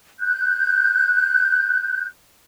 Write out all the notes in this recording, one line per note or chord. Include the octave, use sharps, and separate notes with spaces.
F#6 G6